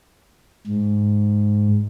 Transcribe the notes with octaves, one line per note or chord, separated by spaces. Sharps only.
G#2